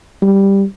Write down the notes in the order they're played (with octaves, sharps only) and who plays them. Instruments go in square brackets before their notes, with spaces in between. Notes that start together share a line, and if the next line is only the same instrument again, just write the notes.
[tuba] G3